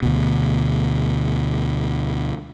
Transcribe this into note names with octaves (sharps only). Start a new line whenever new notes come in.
D2 B2